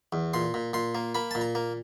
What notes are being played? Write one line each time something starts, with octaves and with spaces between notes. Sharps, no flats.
E2
A#2 C6
A#2
A#2 C6
A#3
A#3 B5
A#2 A5
A#5
A#3